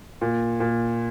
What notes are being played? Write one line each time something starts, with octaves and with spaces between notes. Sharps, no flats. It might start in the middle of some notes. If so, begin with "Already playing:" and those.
A#2
A#2